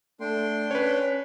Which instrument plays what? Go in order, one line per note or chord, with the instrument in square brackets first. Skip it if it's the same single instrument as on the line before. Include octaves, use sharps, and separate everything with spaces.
[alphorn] A3 [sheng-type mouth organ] D4 G5 C6
[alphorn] C#4 [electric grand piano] B4 C#5